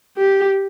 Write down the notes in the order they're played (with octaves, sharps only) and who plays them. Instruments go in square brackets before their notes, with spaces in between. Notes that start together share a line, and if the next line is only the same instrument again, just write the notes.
[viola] G4